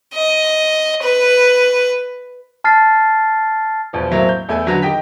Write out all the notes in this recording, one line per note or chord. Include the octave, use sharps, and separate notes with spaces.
D#5
B4
A5 F6 A6 C7
E2 B2 F3
A2 F#3 A3 A#3 C4 E4
G6
E2 A3 A4 G#5
D3 F#3 C#4 F#4 B4
D#3 G4 D#5 G5 B6